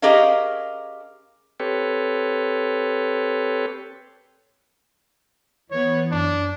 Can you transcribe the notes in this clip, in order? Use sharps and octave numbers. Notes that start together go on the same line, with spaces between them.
C#4 G4 G#4 A#4 D#5 F5
C4 G4 A4 B4 C#5
E3 B3 C#5
F#2 D4